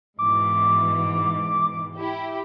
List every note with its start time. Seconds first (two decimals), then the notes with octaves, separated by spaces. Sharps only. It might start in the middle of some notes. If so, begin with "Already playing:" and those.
0.19 G#2 B2 E3 D6
1.96 E4 G4